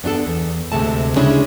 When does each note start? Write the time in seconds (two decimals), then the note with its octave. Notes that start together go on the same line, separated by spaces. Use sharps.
0.04 B3 D4 F#4 A4
0.27 E2
0.72 D2 C3 G#3 A3 A5
1.16 C#3 G#3 C#4 D4 E4 G#4